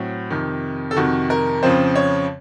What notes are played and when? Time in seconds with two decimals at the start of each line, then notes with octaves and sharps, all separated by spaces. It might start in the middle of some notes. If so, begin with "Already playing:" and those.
Already playing: A2 F#3 C4
0.30 F2 C3 D#3
0.91 A4
0.96 F2 C3 D#3 F#4
1.30 A#4
1.63 F2 C#3 F3 C4 C5
1.96 C#5